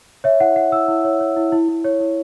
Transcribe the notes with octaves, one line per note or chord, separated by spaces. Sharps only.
C#5 E5
E4 F#5
E4 F#5
E4 E6
E4
C#5
C#5
E4
E4
E4
C#5
E4